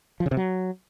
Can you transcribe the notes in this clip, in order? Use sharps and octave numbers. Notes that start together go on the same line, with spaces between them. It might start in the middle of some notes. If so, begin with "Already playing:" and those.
F3
C#3
C3
F#3